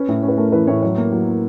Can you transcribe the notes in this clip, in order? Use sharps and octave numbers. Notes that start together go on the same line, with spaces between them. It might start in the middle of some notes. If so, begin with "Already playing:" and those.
Already playing: C#4 B4
A2
C#4
B4
A3 A#4
E3 B4
A2 C#5
F#3 C#5
A#3
F#3
A#3